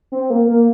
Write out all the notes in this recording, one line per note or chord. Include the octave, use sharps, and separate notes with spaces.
C4
A#3
A#3